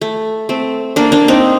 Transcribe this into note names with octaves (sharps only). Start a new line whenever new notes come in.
A3
A3 C4
A#3 D4
A#3 D4
C4 D#4